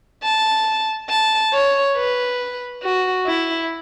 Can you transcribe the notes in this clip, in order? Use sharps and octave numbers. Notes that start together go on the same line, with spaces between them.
A5
A5
C#5
B4
F#4
E4